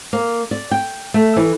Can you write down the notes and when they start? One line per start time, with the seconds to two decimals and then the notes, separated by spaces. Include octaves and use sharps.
0.13 A#3
0.51 D5
0.71 G5
1.14 A3
1.36 E3